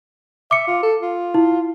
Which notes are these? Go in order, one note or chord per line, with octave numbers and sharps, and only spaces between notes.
E5 D6 C#7
F4
A4
F4
E4